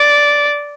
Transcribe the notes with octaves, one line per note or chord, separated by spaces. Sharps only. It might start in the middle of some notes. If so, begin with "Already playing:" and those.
Already playing: D5